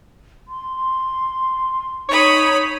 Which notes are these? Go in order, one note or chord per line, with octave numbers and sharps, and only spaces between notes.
C6
D#4 C#5 B5 D#6